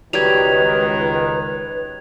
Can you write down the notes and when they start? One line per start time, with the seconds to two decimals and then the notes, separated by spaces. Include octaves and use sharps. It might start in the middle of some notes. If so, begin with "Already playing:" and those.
0.13 C#2 D#3 F#3 G3 G4 B4 G#6 F7